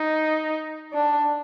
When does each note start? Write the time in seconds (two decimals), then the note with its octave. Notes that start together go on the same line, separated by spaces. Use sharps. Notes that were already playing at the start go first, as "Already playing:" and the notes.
Already playing: D#4
0.93 D4